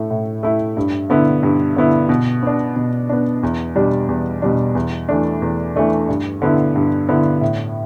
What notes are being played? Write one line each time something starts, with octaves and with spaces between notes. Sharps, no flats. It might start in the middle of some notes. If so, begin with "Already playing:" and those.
Already playing: A2 A3 E4
A2
A3 E4
G2
D3 B3 E4
G2
D3 B3 E4
B2
B3 D4
B2
B3 D4
E2
B2 G3 D4
E2
B2 G3 D4
E2
E3 A3 D4
E2
E3 A3 D4
G2
D3 B3 E4
G2
D3 B3 E4
A2